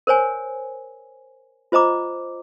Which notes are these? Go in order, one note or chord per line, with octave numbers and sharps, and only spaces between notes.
A#4 C5 C#5 G#5
F4 C5 D#5 A#5 D6